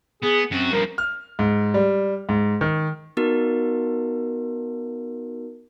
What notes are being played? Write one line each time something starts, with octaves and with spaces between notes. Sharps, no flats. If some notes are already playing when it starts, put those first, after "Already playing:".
B3 G#4
F#2 C4 F#4
G2 F3 A#4
F6
G#2
G3
G#2
D#3
B3 D#4 F#4 A#4